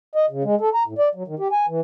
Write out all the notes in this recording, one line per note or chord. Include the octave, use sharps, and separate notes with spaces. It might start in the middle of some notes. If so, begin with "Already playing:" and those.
D#5
C#3
G#3
A4
A#5
A2
D5
F#3
D#3
G4
G#5
E3